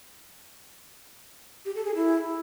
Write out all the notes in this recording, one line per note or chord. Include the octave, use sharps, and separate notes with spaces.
G4
A4
G#4
E4